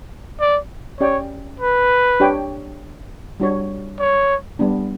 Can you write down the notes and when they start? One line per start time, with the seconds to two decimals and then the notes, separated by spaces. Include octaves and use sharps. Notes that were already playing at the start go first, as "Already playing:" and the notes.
0.40 D5
1.00 C#4 G4 C#5 D5 G5
1.60 B4
2.20 D4 G4 C#5 G5
3.40 G3 D4 F#4 C#5
4.00 C#5
4.59 G3 B3 D4